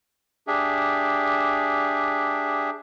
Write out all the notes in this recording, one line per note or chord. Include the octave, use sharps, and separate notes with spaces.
D4 G4 G#4 E5